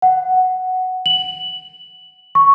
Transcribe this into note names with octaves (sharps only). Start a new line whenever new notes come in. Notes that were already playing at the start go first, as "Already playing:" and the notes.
F#5
F#7
C#6